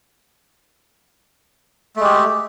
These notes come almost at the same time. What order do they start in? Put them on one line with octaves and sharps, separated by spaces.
A3 G#3 G4